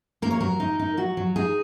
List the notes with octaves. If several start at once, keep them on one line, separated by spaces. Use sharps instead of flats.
A#3 A#4
C#5
F#3 A#4
D#4
D#4
F#3 F#4
F#3
D#4 G#4